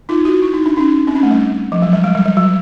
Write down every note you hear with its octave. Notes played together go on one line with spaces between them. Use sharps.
D#4 F4
E4 F#4
E4
D#4
D4
C#4 D#4
C4 D4
C#4
A3
G3
F3
F#3
G3
G#3
G3
G3
F#3